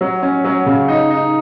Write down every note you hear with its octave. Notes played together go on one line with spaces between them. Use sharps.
F#3
C#4
F#3
C#3
D#4
D#4